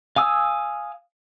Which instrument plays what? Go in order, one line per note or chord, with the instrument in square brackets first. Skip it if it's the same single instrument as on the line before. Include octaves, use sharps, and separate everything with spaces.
[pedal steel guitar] F5 G#5 D#6 E6